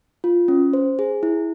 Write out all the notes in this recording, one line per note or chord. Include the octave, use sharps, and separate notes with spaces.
F4
C#4
C5
G#4
E4